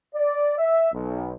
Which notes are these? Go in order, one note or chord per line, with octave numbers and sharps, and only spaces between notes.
D5
E5
B1